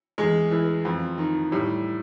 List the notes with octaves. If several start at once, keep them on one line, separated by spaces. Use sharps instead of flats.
E2 G#3
E3
F2
D#3
A2 G3